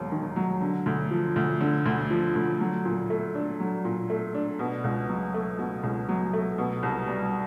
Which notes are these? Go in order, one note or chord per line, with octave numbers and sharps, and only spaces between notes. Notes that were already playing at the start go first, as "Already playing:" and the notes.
Already playing: E1 D#2 F#3
D#3
F#3
D3
D2
F3
D2
D3
D2
F3
D2
F#3
A#2
A3
D4
F#3
A#2
A3
D4
B2
C#2
F#3
A3
B2
C#2
F#3
A3
B2
C2
G3